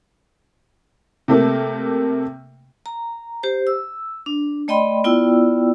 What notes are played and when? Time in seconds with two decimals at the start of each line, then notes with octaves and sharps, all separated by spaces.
1.28 C3 A3 A#3
2.86 A#5
3.43 G4 C5
3.67 E6
4.26 D4
4.68 A3 D5 D#5 G5 B5 C6
5.04 B3 E4 F4 D5 G5 E6